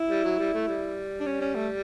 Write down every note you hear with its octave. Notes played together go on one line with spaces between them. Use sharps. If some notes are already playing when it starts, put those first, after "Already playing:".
Already playing: E4
G3
F#3
G3
A3
G3
D4
C#4
C#4
A3